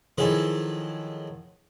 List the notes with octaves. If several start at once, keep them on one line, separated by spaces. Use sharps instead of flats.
D#3 F3 F#3 E4 G#4 A4